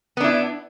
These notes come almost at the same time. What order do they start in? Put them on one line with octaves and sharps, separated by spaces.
B3 D4 E4